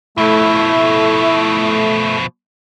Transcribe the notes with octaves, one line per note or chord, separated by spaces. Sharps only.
B2 F3 A3 E4